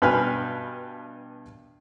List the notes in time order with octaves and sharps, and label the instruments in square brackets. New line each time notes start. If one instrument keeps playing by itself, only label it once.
[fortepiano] G2 B2 B4 G#5 F6